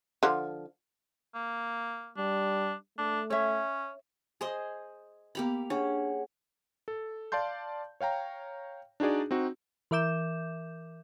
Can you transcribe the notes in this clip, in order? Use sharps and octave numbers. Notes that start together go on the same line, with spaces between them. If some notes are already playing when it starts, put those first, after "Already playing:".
D3 F3
A#3
G3 D4
A3 D4
C#4 C#5 E5
G#4 C5 D#5
A#3 B3 G4 B5 F7
C#4 D4 G#4 C#5 F#5
A4
D5 F5 A5 C6 G6
C#5 F5 G5 A#5
D4 D#4 F#4 G#4 D5
C4 D#4 F#4
E3 A#4 E5 D6 G6 E7